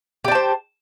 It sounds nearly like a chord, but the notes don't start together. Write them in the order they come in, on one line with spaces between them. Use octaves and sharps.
G4 D5 A5 C5